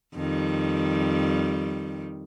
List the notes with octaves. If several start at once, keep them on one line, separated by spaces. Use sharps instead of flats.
F2 D#3 G3